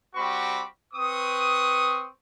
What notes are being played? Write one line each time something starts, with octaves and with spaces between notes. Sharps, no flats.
G3 C4 F#4 B5 C#6 D6
C4 B4 C#6 D#6